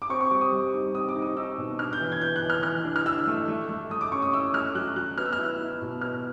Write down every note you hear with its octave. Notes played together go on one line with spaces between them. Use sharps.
D6
C4 C#6
C#6
G3 D6
D#6
G3
D#4
C4 D#6
D6
D#4
D#6
D#4 E6
B2
D4 F6
G6
E3
G#6
E3 G6
F#6
E3
F6
E3 F6
D4
F6
D4 E6
A3
A3
A3
A3 D#6
D6
C#4 C#6
D#6
E4 E6
A3 F6
F#3 F#6
F#3 F#6
B3 F6
E6
F6
E4
E4
B2
B3 F6